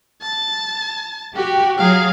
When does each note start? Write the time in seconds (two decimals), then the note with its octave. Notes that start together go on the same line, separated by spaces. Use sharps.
0.22 A5
1.36 F#4 G4
1.78 F#3 G#4 F5